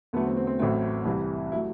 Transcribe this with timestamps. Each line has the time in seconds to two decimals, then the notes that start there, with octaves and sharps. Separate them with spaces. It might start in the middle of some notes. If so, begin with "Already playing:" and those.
0.13 E2 D3 F#3 A3 B3
0.25 C4
0.37 C4
0.47 C4
0.59 A1 A2 F#3 A3 C4
1.05 C2 C3 E3 G3
1.52 F#3 A3 E4